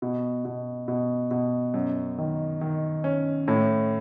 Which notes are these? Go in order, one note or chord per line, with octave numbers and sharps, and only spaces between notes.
B2
B2
B2
B2
F#2
D#3
D#3
C#4
A2